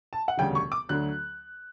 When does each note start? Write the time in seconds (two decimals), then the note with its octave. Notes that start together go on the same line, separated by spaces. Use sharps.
0.13 A5
0.28 F#5
0.38 E1 D2 C#3 G3 G5
0.55 C#6
0.72 D6
0.89 D2 D3 F#3 F#6